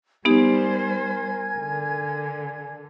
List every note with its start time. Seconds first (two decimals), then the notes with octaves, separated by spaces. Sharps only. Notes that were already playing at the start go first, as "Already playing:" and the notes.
0.25 G3 B3 D#4 G4 A#4 C5 G#5 G#6
1.58 D3